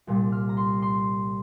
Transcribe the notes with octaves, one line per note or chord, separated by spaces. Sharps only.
C2 A#2 G3
F6
A#5
C6
C6